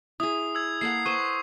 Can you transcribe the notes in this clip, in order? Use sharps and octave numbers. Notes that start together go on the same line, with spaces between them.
E4 G#4 D#6
E6 G#6
A#3 A4 F#5 C7
B4 C5 C#6